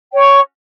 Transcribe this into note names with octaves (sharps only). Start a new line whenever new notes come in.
C#5 G5 C#6